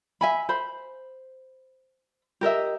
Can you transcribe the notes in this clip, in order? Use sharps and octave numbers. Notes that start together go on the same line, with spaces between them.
E5 G#5 B5
C5 B5
G4 A#4 D#5 E5